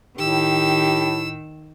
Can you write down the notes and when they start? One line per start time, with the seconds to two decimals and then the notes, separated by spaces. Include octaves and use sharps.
0.19 A2 D#3 G4 E6